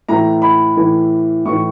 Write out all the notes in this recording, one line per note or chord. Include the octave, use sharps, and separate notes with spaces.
A2 E3 A#5
B5
A2 E3
A2 E3 C#6